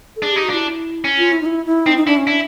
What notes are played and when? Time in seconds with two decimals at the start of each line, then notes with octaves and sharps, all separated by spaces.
0.16 A4
0.22 D4 G#4
0.33 D#4 G4
0.44 F#4
0.49 D4 E4
1.04 C#4
1.18 F4
1.32 E4
1.41 D#4
1.46 E4
1.65 E4
1.86 C4 D#4
1.97 D#4
2.07 D4 E4
2.17 C#4
2.27 D4 E4